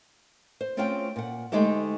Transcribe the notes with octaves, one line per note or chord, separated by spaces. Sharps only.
C5
A3 C4 C#4 F4 G#4 G5
A#2 F#5
D2 G#3 A3 D#4 G4 E5